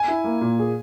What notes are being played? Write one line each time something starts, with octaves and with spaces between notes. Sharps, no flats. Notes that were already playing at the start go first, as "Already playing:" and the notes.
Already playing: G#5
E4
A#3
A#2
G#4